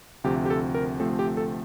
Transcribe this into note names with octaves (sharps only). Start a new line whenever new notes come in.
D2 C3 F3 A3 C4 G4
G4
A4
A#4
D2 C3 F3 A3 C4 A4
G4
A4